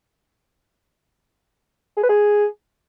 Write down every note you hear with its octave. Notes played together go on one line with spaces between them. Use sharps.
G#4
B4
G#4